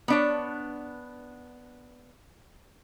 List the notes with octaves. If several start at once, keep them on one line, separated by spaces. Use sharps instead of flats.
B3 D4 C#5